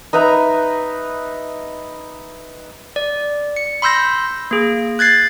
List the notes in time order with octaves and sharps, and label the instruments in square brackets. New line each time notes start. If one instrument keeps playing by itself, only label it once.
[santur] D#4 B4 E5 A#5
[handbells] D5
C#7
B5 C6 E6 G6 A#6
A#3 G#4
F#6 G#6 A6 C7